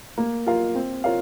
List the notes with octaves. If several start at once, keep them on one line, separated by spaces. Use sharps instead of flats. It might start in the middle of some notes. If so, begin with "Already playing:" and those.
A#3
F4 A#4 F5
C4
F4 A#4 C#5 F5